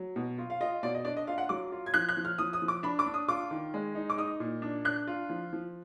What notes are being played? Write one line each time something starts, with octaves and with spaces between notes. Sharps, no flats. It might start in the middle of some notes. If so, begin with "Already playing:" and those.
Already playing: F#3
B2
F4
F5
F4 D#5
B2 D5
D#5
D4 D5
D#5
F4 F5
F#5
F#3 D6
F4
G#6
F3 F#6
F#6
F3
F6
F3 D#6
D#6
F3
D6
D4 B5
D6
D4
D#6
F4 D6
D#3
G#3
D#4
D6
D#4 D#6
A#2
D4
D4 F#6
F4
F3
F3